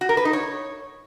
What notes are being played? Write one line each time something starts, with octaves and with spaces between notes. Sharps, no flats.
F#4
A#4
B4
D#4
C#5